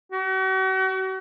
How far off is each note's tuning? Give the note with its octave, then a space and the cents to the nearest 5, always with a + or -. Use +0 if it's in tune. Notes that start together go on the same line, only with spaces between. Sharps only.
F#4 +40